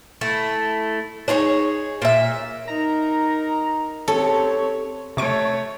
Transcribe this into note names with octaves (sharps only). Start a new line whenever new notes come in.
A3 E4
D4 D#4 G#4 C#5
A#2 E5
D#4 A#4 A#5
C4 G4 A4 C#5
C3 A3 C#5 C#6 D7